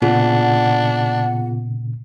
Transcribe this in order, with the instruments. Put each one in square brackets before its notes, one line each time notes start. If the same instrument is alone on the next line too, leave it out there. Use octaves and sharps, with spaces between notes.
[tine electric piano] A#2 C#3 [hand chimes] B3 F4 G#4 [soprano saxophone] D4 [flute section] F#5